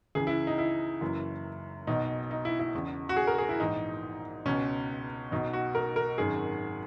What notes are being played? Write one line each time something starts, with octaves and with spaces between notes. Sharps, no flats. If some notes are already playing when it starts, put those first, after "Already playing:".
C#2 C#3 E3 G#4
E4
D#4
E4
F#1 F#2 E3
B1 B2 D#4
D#4
E4
E4
E1 E2 C#3
F#4
G#4
A#4
G#4
E4
A#1 G#2 E3 D#4
C#2 B2 C#4
B1 B2 D#4
F#4
A#4
A#4
G#1 F#2 D#3 G#4